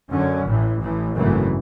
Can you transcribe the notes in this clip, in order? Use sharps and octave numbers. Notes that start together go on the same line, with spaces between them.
F#2 D3 F#3 C#4
A1 A2 E3
A1 A2 E3
G#1 F#2 C#3 E3 A3